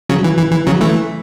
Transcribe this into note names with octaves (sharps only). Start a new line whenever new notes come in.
C#3 F#3
E3
E3
E3
C#3 F#3
E3 A3